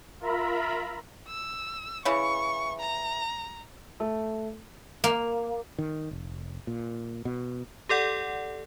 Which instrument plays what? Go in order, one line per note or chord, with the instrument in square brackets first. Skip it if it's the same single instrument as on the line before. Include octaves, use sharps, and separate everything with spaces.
[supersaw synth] F4 A#4 E5 A#5 B5
[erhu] E6
[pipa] C#3 E3 [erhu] C#6
[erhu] A#5
[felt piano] A3
[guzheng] A#3
[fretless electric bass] D#3
F1
A#2
B2
[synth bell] G4 A4 D5 F#5